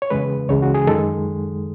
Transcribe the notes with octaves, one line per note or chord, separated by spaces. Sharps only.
C#5
E2 C#3 G#3 B4
C#2 C#3 E3 G#3 C#5
F#4
G#4
F#2 D#3 G#3 A4